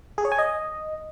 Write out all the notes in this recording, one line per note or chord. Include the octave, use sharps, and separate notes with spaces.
G#4
C#5
G#5
D#5